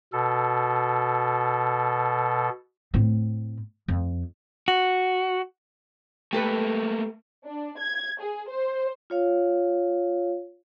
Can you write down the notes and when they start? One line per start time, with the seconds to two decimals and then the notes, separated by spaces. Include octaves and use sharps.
0.13 B2 A4
2.94 A2 C4
3.88 F2
4.68 F#4
6.33 A3 A#3 G4 A4 B4
7.45 D4
7.79 G#6
8.21 G#4
8.50 C5
9.10 F4 C#5 F5